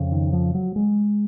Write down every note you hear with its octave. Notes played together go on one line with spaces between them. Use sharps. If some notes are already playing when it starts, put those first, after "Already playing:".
Already playing: F2 C#3
D#3
F3
F#3
G#3